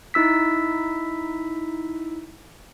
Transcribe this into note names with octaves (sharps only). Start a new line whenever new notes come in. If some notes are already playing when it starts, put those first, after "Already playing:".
D#4 E4 E6 B6